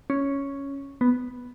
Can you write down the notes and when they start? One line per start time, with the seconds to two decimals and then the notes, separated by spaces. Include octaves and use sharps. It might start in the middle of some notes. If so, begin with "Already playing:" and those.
0.10 C#4
1.01 B3